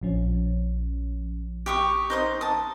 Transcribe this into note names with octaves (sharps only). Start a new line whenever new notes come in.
A#1 F3 C#4
G4 C#6 D#6
D#4 C5 D#6
A5 D#6